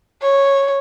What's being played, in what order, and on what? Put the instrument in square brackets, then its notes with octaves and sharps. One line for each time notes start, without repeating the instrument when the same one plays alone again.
[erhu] C#5